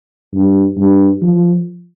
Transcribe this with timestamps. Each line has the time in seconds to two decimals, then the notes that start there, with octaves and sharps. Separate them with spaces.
0.34 G2
0.78 G2
1.22 F3